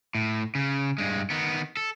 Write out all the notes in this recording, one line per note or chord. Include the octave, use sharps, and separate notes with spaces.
A2
C#3
G2 G#3
D#3 B3
A4